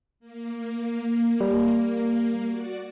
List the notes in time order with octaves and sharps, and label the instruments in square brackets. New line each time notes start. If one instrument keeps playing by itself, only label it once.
[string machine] A#3
[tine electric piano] G3
[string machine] F#4 D5